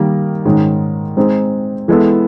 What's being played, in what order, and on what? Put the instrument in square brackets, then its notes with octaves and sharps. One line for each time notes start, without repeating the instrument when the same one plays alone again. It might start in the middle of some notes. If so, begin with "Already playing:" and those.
Already playing: [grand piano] D#3 G3 A#3
G#2 D#3 G#3 C#4
G#3 C4 D#4 G#4 C5
E3 G#3 B3 E4 A4